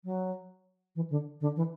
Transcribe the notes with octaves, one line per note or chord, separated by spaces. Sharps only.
F#3
E3
D3
D3
E3